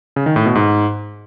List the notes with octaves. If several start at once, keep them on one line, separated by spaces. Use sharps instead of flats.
C#3
D#3
A2
B2
G#2